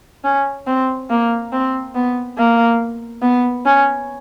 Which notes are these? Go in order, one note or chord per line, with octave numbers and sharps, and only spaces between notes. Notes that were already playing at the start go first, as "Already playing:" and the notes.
C#4
C4
A#3
C4
B3
A#3
B3
C#4